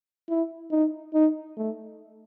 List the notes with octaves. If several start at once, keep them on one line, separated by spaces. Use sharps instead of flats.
E4
D#4
D#4
A3